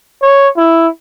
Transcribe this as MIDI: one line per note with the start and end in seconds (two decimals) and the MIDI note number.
0.22 0.48 73
0.57 0.88 64